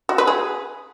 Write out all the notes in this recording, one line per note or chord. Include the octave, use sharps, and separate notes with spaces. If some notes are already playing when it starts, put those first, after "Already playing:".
F#4
B4
G#4